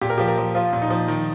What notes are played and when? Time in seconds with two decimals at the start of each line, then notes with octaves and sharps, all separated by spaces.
0.01 A#2 G4
0.10 A#4
0.18 F3 G4
0.28 A#4
0.38 F3
0.55 F3 F4
0.73 A#2
0.82 D#4
0.90 F3
1.08 D#3